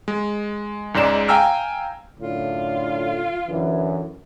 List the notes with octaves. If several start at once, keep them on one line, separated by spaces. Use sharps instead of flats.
G#3
C#2 G#2 G#3 D5 E7
F5 G5 G#5 A#5 E6 F6
F#2 A2 D3 F4
F#2 D3 E3